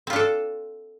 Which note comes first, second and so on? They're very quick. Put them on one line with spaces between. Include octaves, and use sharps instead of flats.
C4 F4 D4 A4